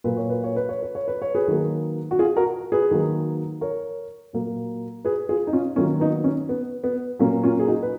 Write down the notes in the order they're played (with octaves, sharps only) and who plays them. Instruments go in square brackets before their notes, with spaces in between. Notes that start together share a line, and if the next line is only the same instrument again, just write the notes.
[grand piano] A#2 F#3 A#3 B4
C#5
B4
C#5
B4
C#5
B4
C#5
B4
C#5
G#4 B4
D#3 F#3 A#3
F#4
F4 G#4
F#4 A#4
G#4 B4
D#3 F#3 A#3
A#4 C#5
A#2 F#3 A#3
G#4 B4
F4 G#4
D#4
C#4 F4
D#3 F#3 A#3 C#4 F4
B3 D#4
C#4
B3
B3
A#2 F#3 A#3 C#4
C#4 F4
G#4
D#4 F#4
B4